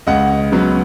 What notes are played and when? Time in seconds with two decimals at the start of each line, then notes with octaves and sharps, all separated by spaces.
0.07 C#2 D#5 F#5
0.52 C#3 F#3 B3